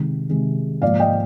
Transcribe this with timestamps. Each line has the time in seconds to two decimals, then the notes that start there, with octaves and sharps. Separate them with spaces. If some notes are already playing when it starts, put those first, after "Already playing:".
Already playing: C3 D#3 G#3
0.29 C3 D#3 G#3
0.82 G#2 F3 A#3 D5 F5
1.00 D#5 G5